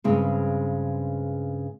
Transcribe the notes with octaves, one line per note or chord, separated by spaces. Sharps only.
G2 C#3 G#3 C4